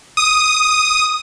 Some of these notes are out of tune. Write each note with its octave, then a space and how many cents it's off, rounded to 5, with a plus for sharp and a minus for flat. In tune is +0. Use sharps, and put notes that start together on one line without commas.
D#6 +0